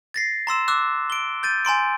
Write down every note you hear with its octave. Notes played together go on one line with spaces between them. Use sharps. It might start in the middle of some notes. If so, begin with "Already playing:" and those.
A6 A#6 C7
A#5 C6 E6 E7
D6 E6 F#6
D7 G7
G6 A6 D#7
G#5 A#5 C6 D7